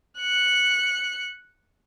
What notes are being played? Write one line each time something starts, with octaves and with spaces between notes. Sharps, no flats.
F#6 C#7